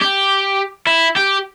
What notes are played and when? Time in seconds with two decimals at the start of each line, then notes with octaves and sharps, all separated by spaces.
0.02 G4
0.87 E4
1.16 G4